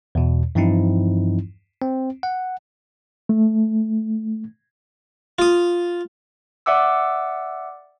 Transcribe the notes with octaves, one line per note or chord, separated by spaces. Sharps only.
E2 B2
G2 E3 F3 C4 D#4 E4
C4
F#5
A3
F4 D#6
D5 E5 F#5 D6 E6